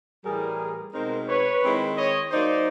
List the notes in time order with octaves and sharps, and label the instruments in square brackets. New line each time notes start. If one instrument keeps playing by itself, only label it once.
[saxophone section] A2 E3 G3 [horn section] G#4 A#4
[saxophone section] B2 G#3 C4 D#4 [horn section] A#4 C5
[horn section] B4 C#5
[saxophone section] D#3 G#3 C4 E4
[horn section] C#5 D#5
[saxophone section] F#3 A#3 D#4 [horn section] C5 D5